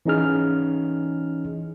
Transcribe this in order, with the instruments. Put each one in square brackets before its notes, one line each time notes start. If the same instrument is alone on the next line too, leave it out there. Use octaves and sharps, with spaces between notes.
[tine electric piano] E3 C#4 D#4 G#4 F6